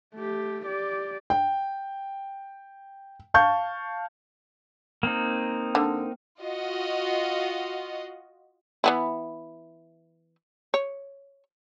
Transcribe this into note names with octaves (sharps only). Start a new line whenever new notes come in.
A3 G4
G4 D5
G5
F5 A5 C#6 G6
A#3 C4 D#4
D3
F4 F#4 D#5
E3 B3 E4
C#5